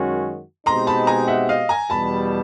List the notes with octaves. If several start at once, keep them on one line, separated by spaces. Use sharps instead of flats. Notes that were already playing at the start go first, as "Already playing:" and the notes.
Already playing: F#2 D#3 G#3 C#4 F#4
B2 G#3 C4 D#4 G4 A#5 C6
A5 B5
G#5 A#5
E5 F#5
D#5 F5
G#5 A#5
E2 B2 G3 A5 B5